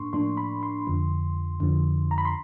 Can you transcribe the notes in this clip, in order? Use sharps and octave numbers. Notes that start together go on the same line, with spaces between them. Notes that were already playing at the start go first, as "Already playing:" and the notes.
Already playing: A2 A#3 D4 C6 C#6
A2 F3 A#3 D4 C6
B5
C6
F2 D3 F3
F2 D3 F3
A#5
B5
C6